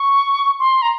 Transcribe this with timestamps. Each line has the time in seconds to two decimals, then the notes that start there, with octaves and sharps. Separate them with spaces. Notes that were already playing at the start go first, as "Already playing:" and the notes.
Already playing: C#6
0.59 C6
0.82 A#5